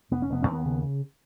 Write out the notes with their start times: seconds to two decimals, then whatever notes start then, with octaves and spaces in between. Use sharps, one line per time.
0.11 F1 B3
0.22 C#4
0.29 F1 B3
0.42 C#4
0.47 D#2
0.53 B3
0.65 C#3